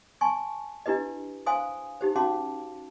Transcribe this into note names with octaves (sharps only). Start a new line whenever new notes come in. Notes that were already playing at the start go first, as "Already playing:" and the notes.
G#5 A5 C6 C#6
D4 E4 G4 B4 D#5
C5 F5 G#5 C6 D#6
D#4 G4 C5
C#4 F#4 F5 A5 C6 D6